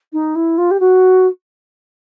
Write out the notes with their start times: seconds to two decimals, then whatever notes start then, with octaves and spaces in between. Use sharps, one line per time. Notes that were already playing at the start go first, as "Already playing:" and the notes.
0.12 D#4
0.35 E4
0.57 F4
0.70 G4
0.79 F#4